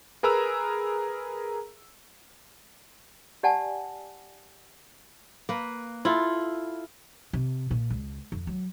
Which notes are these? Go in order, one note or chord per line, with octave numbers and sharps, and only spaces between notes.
G#4 A#4 B4 A#5 E6
G4 D5 F#5 G#5 A5
A#3 B4
E4 F4 A4
C3
A#2
C#2
F2
F#3